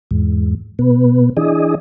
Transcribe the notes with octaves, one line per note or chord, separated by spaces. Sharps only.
E2 G#2
B2 B3
E3 D4 G#4 D#5